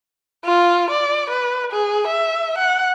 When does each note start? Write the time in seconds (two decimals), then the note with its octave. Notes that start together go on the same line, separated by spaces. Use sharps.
0.45 F4
0.90 D5
1.30 B4
1.72 G#4
2.07 E5
2.58 F#5